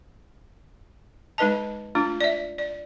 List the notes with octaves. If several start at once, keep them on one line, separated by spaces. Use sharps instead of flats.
G#3 D#4 B4 D#5 A5
A3 D4 F4
D5 E5
D5